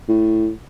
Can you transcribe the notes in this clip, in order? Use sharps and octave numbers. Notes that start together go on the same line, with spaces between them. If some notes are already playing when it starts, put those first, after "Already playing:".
A2